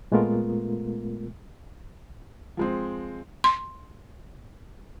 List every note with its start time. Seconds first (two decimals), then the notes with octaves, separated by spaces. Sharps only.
0.12 A#2 G#3 A3 B3 F4 A#4
2.57 F3 G#3 C4
3.44 C6